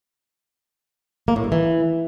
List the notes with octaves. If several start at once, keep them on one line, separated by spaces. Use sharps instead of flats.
A#3
A2
G2
E3